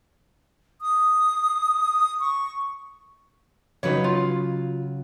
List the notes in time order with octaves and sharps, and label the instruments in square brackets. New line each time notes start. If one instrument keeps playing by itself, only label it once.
[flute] D#6
C#6
[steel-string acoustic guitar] C#3 F#3 [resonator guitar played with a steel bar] D#4 B4 C#5
[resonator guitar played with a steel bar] F4